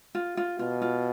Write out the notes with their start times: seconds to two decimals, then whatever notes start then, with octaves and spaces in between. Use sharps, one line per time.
0.15 F4
0.37 F4
0.59 B2 F4
0.82 F4